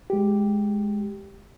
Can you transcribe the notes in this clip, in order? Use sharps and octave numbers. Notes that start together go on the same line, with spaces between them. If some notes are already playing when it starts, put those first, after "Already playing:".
G#3 G4